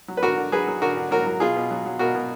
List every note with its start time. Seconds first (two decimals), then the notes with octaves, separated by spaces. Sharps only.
0.08 F#3
0.17 B4
0.23 D3 F#4 A#4
0.37 D3
0.52 F#3 G#4 B4
0.67 F#3
0.82 D3 F#4 A#4
0.97 D3
1.11 F#3 F#4 A#4
1.26 F#3
1.40 B2 F4 G#4
1.56 B2
1.71 F#3
1.86 F#3
1.99 B2 F#4 A#4
2.15 B2